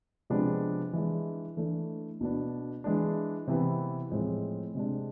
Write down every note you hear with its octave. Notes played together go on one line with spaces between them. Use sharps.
C3 F3 G#3 B3 D4
E3 G#3 D4
E3 A3 D4
B2 B3 D4
E3 G#3 D4
C3 E3 B3
A2 F3 G#3 C4
C3 G#3 D4